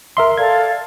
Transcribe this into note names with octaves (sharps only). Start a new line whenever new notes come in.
A#4 E5 C6
A4 D5 F5 G#6